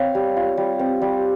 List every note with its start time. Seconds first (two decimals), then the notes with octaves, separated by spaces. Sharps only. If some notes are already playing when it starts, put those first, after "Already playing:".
Already playing: C4 C#5 F5
0.15 G3
0.37 F4
0.57 G3
0.79 C4
1.02 G3